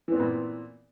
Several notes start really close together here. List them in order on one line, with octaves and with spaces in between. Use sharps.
E3 C4 B3 A#2